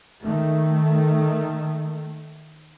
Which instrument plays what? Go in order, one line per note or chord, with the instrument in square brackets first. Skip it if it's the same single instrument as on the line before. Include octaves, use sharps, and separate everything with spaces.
[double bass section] D#3 A3